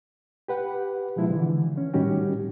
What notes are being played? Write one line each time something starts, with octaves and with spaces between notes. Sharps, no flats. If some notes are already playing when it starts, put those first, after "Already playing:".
G4 B4 F#5
B2 F3 G#3 E4
D3 E3
C#4
A2 D#3 G3 C#4 F#4 G4